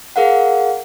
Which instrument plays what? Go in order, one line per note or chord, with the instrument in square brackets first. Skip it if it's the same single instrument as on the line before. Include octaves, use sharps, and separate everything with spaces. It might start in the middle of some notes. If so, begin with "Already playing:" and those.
[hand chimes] G#4 A#4 F5 F#5